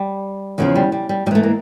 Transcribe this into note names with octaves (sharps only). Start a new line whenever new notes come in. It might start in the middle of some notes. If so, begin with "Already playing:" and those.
Already playing: G3
E2 C#3 F3 F#3
G3
G3
G3
G#2 E3 G3 A3
A#3